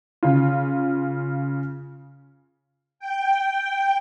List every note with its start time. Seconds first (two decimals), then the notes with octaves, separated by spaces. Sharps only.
0.23 C#3 F4
2.99 G5